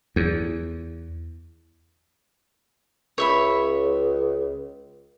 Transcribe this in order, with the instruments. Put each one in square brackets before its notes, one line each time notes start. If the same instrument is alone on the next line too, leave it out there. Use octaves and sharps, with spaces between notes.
[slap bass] E2
[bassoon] C#2 [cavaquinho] C#5 E5 B5